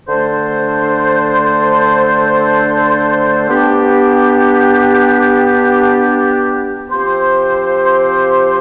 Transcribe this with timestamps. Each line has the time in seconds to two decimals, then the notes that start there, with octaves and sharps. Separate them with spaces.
0.08 D3 A3 D4 A4 C5
3.49 B3 D4 G4
6.89 F3 C4 G4 C5